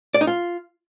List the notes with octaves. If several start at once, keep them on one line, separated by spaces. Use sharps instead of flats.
D5
D#4
F4